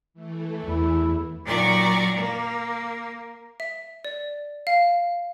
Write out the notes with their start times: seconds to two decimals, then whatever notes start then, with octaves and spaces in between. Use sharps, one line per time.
0.14 E3 A3
0.63 E2 E4
1.44 A#2 D#3 F#3 D5 A#5 C#6
2.16 A#3
3.60 E5
4.05 D5
4.67 F5